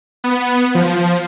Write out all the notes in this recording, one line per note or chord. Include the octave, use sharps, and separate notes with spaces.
B3
F3